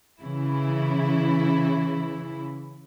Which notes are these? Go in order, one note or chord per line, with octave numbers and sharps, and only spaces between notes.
C#3 E3 E4